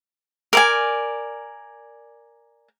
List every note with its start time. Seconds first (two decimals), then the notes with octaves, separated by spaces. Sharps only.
0.53 A#4 D5 G#5